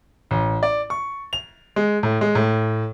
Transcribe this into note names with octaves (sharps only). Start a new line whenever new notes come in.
A1
D5
C#6
F7
G#3
A2
G#3
A2